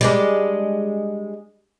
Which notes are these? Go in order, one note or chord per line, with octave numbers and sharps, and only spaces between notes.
G3 G#3 D4